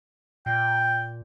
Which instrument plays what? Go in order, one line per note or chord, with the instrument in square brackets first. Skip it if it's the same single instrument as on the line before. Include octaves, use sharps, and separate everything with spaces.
[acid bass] A#2 [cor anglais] G5